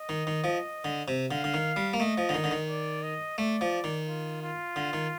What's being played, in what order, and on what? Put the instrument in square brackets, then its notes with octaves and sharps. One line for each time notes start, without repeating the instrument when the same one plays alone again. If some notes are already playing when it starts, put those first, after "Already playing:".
Already playing: [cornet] D#5
[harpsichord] D#3
D#3
F3
D3
C3
[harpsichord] D3 [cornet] F5
[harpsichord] D3
D#3
G3
A#3
[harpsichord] A3 [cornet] D#5
[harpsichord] F3
D3
D#3
D3
D#3
[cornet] D5
D#5
[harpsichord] A3 [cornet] D5
[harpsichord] F3
D#3
[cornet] F4
F4
[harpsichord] D3
D#3